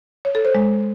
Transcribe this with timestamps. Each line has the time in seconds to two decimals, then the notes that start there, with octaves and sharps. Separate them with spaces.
0.25 C#5
0.35 A4
0.45 C5
0.55 G#3